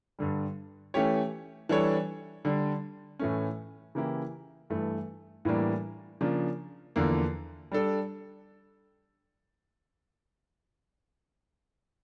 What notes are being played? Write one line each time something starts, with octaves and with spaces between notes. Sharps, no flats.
G2 D3 G3
E3 A3 C#4 G4 C#5
E3 G3 D4 A4 C#5
D3 G3 D4
A2 E3 A3 C#4
C#3 E3 A#3 E4 G4
G2 E3 A3
A2 E3 G3 A#3 D4
C#3 F3 A#3 D4
E2 D3 F3 A#3
G3 D4 A4